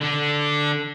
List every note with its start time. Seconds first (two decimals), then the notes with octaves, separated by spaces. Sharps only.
0.01 D3 D4